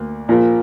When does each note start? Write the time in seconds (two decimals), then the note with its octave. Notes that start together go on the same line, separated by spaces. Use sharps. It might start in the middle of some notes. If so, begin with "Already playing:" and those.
Already playing: D2 A#3
0.28 A#1 A#2 F3 A#3